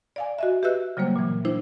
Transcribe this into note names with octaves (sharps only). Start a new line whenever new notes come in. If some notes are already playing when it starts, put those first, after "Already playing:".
D5 F5 G#5
F#4 D#5 E5
G4 B4 D#5 E5 E6 F#6
C#3 F#3 G3 A#3 C5
A#2 E3
D4 E4 C5